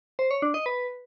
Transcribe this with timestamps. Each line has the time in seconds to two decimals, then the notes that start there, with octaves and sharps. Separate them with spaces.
0.19 C5
0.31 C#5
0.42 D4
0.54 D#5
0.66 B4